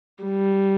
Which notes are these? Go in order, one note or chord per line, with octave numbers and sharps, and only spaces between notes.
G3